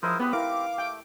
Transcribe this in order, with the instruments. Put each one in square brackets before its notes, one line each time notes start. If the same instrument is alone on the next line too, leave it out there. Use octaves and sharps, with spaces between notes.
[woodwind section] C#2 D#6 [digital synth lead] F3 [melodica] E4 A#4 C5
[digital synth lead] B3 [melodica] C4 G4 [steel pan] B4
[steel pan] E4 A#4 [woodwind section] F5 [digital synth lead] D6
[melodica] A3 [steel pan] G5